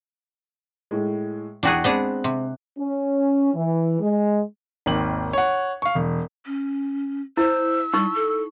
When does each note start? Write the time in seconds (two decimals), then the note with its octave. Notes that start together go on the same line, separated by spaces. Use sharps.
0.91 A2 G#3
1.63 E2 D4 F#4 G#4 G5 F#6
1.84 G#3 B3 C4 D4 G#4
2.24 C3
2.79 C#4
3.54 E3
4.01 G#3
4.86 G#1 D#2 F#7
5.33 C#5 F#5
5.82 F5 C#6
5.95 E1
6.46 C#4
7.37 E4 C5 E6
7.94 G3 D#4 C#6
8.15 A4